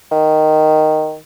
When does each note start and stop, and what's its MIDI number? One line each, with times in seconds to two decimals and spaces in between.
0.11 1.17 51